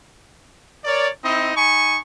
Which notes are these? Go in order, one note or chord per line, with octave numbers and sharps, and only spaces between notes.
A#4 C#5 D5
C4 D#4 E4 D#5
D#4 G#5 B5 C#6